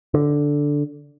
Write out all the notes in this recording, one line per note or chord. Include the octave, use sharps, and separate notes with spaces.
D3